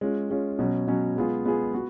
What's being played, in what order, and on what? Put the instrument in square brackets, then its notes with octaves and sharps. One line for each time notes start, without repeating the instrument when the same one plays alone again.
[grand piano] G#3 C#4 F4
G#3 C#4 F4
B2 F#3 C#4
B2 F#3 C#4
G#3 B3 F4 G#4
G#3 B3 F4 G#4
B3 F#4